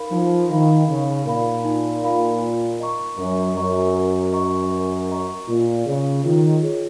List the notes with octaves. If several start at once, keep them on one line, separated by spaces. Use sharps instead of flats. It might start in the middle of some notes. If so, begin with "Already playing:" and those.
Already playing: D#4 A#4 F5 B5
F3 D#4
D#3 A#4 F5 B5
C#3 D#4
A#2 A#4 F5 B5
D#4
A#4 F5 B5
A#4
D#5 A#5 C#6
F#2 A#4
F#2 D#5 A#5 C#6
A#4
D#5 A#5 C#6
A#4
D#5 A#5 C#6
A#2 F4
C#3 G#4 C#5
D#3 F4
G#4 C#5